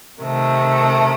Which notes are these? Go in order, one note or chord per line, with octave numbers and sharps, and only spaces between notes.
C3 D#3 A3